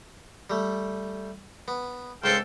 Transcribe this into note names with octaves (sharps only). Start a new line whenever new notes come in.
G3 A3
B3
C#2 G#2 C4 A4 F5 G5